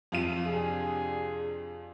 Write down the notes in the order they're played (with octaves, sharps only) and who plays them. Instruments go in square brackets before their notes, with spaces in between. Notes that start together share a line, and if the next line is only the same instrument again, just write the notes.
[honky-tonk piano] F2 F4 D#7
[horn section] C3 D4 G#4